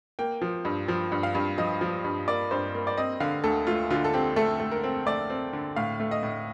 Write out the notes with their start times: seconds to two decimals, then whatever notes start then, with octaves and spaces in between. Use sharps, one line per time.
0.19 A#3 G5
0.41 F3
0.65 G2
0.88 F3
1.12 G2
1.23 F5
1.35 G2
1.58 F3 D#5
1.81 F3
2.04 G2
2.28 A#3 D5
2.51 G2 C5
2.74 A#3
2.87 D5
2.97 C4 D#5
3.20 D3 F5
3.44 D2 A4
3.67 A3 F4
3.90 D3 F4
4.04 A4
4.14 C4 G4
4.36 A3 A4
4.60 A3
4.71 A#4
4.84 C4
5.06 A3 D5
5.30 C4
5.53 D3
5.76 A2 F5
6.00 A3
6.11 D#5
6.23 A2